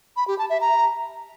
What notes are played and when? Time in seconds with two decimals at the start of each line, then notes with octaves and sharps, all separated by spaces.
0.16 B5
0.28 G4
0.39 A5
0.50 E5
0.61 A#5